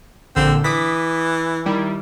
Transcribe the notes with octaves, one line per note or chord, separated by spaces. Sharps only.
A#1 D3 C4 E6
E3 D6 D#6 B6
D#3 G3 E4